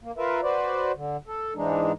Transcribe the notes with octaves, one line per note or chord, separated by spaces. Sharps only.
A#3
F4 A#4 B4 E5
F#4 B4 C5 D5
D3
A4
G#2 E3 G#3 D4 D#4